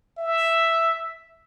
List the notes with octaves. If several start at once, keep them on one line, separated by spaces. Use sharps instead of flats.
E5